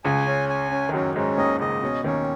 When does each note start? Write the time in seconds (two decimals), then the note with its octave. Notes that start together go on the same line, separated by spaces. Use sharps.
0.05 C#2 C#3 G#5
0.26 C#4
0.49 G#5
0.71 C#4
0.89 D#3
0.93 F#2 F#3 C#4
1.15 G#2 G#3 C#4
1.37 D#2 D#3 D#5
1.60 C#2 C#3 D#5
1.83 B2 C#4
2.04 D#2 D#3 C#4